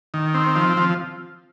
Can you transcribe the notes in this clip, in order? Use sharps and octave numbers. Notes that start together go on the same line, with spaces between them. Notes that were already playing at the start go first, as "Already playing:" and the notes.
D#3
C4
F3
F3